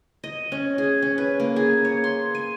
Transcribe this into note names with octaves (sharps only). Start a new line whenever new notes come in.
D#5
C#4
G#4
C#4
B4
A#3
G#4
C#5
C6
G#5